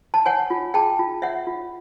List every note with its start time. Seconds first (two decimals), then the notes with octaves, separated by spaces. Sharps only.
0.14 A5
0.25 C#5 F#5 G#5
0.50 F4
0.74 G#4 G5 A5
0.99 F4
1.22 C#5 E5 F#5
1.47 F4